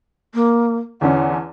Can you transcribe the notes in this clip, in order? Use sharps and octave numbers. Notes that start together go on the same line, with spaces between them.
A#3
E2 D3 C#4 F#5